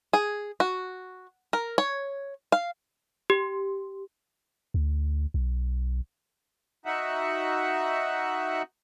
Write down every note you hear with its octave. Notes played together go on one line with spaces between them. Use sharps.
G#4
F#4
A#4
C#5
F5
G4
D2
B1
D#4 F#4 E5 F#5